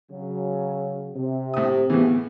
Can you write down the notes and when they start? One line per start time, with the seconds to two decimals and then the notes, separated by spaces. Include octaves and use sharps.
0.11 C#3 F#3
1.15 C3
1.54 A2 D#6
1.90 A2 C#3 E3 B3